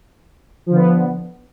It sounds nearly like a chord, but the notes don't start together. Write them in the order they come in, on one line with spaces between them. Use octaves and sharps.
F3 D3 B3